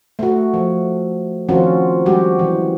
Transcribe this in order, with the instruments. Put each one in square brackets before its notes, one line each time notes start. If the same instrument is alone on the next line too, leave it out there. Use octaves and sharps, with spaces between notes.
[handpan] A3 F#4
F3
D#3 F3 C4 C#4 F4 F#4
F3 G3 G#3 F#4 G4
E3